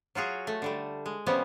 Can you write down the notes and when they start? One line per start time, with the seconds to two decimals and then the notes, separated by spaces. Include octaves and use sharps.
0.15 F#3 F4 F#4 G#4
0.47 A3
0.62 D3 G3 A3
1.06 G#3
1.26 C3 F3 G3 B3 C#4